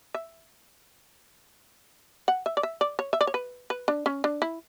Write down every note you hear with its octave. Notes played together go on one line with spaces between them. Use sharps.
E5
F#5
E5
D5
E5
D5
C#5
E5
D5
C#5
B4
B4
D4
C#4
D4
E4